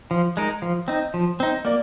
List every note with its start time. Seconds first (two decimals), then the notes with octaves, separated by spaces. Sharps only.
0.11 F3
0.37 G#3 D#4 A#4
0.62 F3
0.88 C4 D#4
1.14 F3
1.40 C4 D#4
1.65 A#3 D5